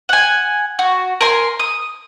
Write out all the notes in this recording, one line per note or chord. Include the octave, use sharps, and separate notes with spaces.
F#5 G#5
F#4
A#4 G#5 C6
D#6